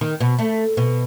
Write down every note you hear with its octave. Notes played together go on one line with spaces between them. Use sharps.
D#3
B2
A3
B2